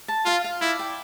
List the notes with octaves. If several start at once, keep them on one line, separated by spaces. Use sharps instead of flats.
A5
F4 F5
F5
E4 D5
G5